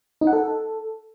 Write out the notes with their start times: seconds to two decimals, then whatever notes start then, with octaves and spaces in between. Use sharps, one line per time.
0.21 D#4
0.27 F#5
0.33 A4